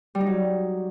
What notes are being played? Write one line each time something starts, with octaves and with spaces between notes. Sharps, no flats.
G3
D#4
F#3